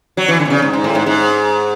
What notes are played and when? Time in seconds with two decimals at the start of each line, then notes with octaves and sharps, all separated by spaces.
0.17 F#3
0.28 E3
0.39 D3
0.45 B2
0.50 C#3
0.62 G#2
0.73 G#2
0.84 A2
0.95 G#2
1.06 G#2